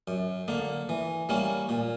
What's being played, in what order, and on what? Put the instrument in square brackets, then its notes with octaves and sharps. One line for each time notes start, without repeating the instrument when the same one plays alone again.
[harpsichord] F#2
D3 A#3
E3
G3 A#3 C#4
A#2